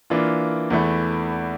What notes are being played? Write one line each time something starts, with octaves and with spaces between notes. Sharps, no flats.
E3 A#3 D4 F4
E2 E3 A3